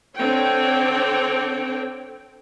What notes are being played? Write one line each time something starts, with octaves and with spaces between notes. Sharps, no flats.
D3 C4 C#5 G5